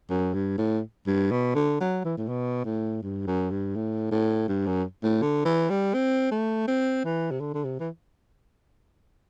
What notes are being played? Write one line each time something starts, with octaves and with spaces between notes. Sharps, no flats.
F#2
G2
A2
G2
B2
D3
F#3
E3
A2
B2
A2
G2
F#2
G2
A2
A2
G2
F#2
A2
D3
E3
G3
C4
A3
C4
E3
C3
D3
D3
C3
E3